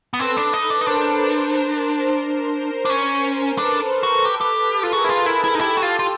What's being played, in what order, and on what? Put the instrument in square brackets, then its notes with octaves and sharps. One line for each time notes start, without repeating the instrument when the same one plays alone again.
[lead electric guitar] B3
[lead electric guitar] C4 [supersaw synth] A4 B4
[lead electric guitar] D4
D#4
D4
D#4
[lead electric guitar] D4 [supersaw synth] A#4 C5
[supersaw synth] A#4 C5
[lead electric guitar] D4
C#4
[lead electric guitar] D4 [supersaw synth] A4 B4
[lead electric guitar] F#4
G4
G4
F4
[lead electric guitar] F#4 [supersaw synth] G#4 A#4
[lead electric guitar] E4
F4
E4
E4
D#4
[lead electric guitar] E4 [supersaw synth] G4 A4
[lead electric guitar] F#4
F4
F4